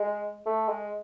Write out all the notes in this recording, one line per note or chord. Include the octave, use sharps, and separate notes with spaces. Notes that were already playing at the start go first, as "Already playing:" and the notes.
Already playing: G#3
A3
G#3